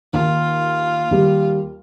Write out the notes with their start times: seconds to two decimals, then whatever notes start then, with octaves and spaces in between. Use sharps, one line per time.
0.13 D#2 F4
1.11 D#2 G3